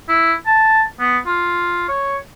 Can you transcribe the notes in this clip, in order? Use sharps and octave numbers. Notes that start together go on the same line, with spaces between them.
E4
A5
B3
F4
C#5